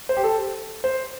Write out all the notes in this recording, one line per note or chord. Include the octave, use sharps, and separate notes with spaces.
C5
G4
A4
C5